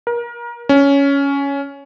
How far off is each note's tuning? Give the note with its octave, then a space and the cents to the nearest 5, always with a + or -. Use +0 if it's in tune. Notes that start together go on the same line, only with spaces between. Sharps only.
A#4 +30
C#4 +10